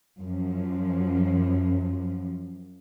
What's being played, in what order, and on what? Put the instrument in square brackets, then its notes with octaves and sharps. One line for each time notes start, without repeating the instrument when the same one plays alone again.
[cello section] F#2 F3